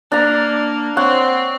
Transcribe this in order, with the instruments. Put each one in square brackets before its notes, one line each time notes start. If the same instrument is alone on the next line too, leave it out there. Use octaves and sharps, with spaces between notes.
[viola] A#3 [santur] D4 A#5
[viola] C4 [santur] C#5 F#5